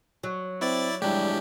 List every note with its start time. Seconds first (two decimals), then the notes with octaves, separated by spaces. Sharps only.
0.23 F#3
0.61 C4 E4 D5 A6
1.02 G3 G#3 D4 E4 G4